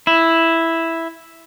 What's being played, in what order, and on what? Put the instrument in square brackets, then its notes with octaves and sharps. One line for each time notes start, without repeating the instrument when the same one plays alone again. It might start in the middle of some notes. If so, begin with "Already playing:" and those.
[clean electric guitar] E4